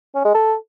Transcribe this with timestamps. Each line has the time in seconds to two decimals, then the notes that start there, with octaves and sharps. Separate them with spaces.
0.15 C#4
0.25 G#3
0.34 A4